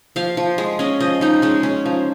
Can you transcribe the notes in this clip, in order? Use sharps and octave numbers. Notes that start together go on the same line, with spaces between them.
F3 F5
F3
G#3
C#4 D#5
F3 D#5
F3 D#4
G#3 C#4
C#4
F3